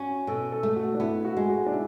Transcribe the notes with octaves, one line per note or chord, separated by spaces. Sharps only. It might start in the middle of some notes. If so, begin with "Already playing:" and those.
Already playing: C#4 F#4
B2 A4
A4
A3
F#4
D4
B3 E4
F#4
G#3
F#4
D4
E4